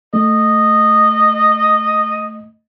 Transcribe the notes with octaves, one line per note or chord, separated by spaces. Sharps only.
A3 D#5